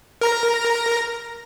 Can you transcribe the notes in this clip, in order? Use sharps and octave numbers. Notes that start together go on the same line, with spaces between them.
A#4 A#5 A#6